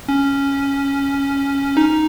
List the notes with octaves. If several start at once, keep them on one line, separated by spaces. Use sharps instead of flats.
C#4
D#4